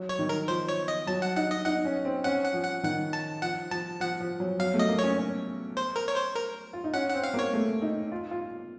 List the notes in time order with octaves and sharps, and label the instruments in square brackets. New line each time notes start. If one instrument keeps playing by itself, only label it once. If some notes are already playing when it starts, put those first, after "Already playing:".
Already playing: [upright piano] F#3
[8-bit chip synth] C#5
[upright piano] D#3
[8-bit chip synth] A#4
[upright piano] F3 [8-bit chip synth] C5
[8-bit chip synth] C#5
D#5
[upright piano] F#3 [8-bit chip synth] A5
[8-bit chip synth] F#5
[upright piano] D#4 [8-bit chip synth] F#5
[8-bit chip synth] D#5
[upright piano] D#4 [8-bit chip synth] F#5
[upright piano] C#4
C4
[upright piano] C#4 [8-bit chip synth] F#5
[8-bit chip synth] F#5
[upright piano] F3
[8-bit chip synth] F#5
[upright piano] D#3 [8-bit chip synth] F#5
[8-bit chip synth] A5
[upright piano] F3 [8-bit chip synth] F#5
[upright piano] F3 [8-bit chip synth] A5
[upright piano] F3 [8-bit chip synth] F#5
[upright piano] F3
F#3
[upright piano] F#3 [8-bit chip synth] F5
[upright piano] A3
[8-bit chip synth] D#5
[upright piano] A#3
[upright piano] C#4 [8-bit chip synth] C#5
[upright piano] C#4
[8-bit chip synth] C5
A#4
C#5
C5
A#4
[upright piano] F4
D#4
[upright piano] C#4 [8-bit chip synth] F#5
[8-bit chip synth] F#5
[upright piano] C4
[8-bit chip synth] F5
[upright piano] A#3 [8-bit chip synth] C#5
[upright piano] A3
D#4
F4
F4